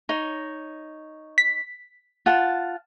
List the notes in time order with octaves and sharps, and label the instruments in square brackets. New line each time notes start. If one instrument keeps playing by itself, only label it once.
[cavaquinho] D#4 C#5
[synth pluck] B6
[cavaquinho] F4 F#5 A5